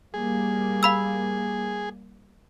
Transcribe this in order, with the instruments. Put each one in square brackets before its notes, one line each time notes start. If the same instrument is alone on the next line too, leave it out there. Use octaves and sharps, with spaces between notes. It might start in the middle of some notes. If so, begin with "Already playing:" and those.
[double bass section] G3 A#3 [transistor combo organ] G#4
[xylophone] F5 B5 E6